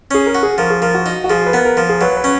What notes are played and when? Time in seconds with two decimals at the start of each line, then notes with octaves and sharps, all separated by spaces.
0.11 C#4 G#4
0.26 A#4
0.35 F#4
0.43 G#4
0.58 F3 A#4
0.70 G#4
0.82 F3 A#4
0.94 F#4
1.06 D#4
1.24 F#4
1.30 F3 G#4
1.46 B4
1.53 B3 A#4
1.65 A#4
1.77 F3 A#4
1.89 G#4
2.01 F#3 B4
2.17 B4
2.24 C#4